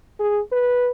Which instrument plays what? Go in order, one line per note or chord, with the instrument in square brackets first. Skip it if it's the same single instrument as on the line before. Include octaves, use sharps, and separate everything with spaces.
[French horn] G#4
B4